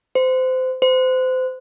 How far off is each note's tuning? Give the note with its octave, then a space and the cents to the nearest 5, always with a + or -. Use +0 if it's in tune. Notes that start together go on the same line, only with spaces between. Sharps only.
C5 -25
C5 -30